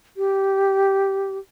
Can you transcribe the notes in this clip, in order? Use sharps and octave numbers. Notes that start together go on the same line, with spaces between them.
G4